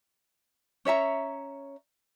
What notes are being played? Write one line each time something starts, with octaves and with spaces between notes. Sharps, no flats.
C#4 C#5 E5 A#5